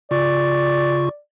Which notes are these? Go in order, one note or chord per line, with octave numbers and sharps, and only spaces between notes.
C#3 F4 D5 C#6